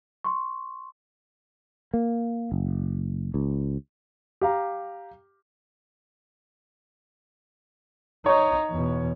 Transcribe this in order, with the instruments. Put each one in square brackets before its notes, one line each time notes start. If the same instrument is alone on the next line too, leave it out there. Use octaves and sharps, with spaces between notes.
[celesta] C6 C#6
[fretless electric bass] A#3
F#1
C#2
[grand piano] G4 F5 A#5
[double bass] D#4 [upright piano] C#5 C#6
[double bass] E2 B2